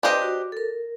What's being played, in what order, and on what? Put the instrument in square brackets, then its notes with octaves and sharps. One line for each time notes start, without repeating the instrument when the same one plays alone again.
[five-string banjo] D4 G4 C5 D#5 [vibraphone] B4
[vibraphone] F#4
A4
A#4